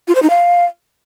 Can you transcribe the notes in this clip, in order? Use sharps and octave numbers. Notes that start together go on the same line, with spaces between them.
F4
C5
D#4
F5